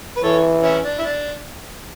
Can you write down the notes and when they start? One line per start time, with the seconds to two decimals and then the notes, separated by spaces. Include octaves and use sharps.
0.17 B4
0.23 E3 A4 C#5
0.63 C#4 E4
0.84 D4
0.99 E4
1.04 D4